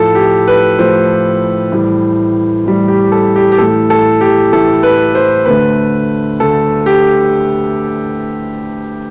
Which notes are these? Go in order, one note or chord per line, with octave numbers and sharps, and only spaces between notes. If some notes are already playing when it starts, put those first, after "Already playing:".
Already playing: A2 F3 A3 A4
G4
B4
A2 F3 A3 C5
A2 E3 G3
A2 E3 G3
G4
A4
G4
G4
A2 E3 A3 A4
A4
G4
A2 E3 A3 A4
B4
C5
D2 D3 A3 B4
D2 D3 A3 A4
G4